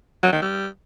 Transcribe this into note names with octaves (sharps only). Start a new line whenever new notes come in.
F#3
D#3
G3